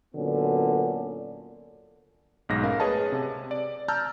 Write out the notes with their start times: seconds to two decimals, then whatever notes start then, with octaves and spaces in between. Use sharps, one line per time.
0.15 A#2 D3 F#3 B3 C#4 D4
2.49 B1 G#2 A#6
2.63 A3 C#4 A#4 F5
2.80 G#4 B4 C#5 D#5 A5
3.12 C3
3.51 D5
3.88 A5 A#5 E6 F6 G6